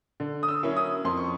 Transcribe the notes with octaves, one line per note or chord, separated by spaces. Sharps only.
D3
D#6
E6
F#3 A#3 C#4 E4
D#6
F2 C6
C#6